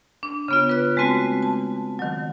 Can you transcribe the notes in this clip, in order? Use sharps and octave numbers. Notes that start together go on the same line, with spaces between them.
D4
C#3 B3 F4
B4 F#6
G#3 A3 C4 F#4
A5
D#3 F#3